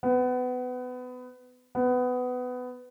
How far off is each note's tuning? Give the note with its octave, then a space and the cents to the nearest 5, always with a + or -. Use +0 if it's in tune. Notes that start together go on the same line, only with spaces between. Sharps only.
B3 +25
B3 +20